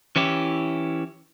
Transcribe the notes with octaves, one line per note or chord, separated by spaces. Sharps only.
E3 C#4 E4 G4